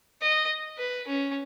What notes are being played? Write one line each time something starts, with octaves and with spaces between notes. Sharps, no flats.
D#5
B4
C#4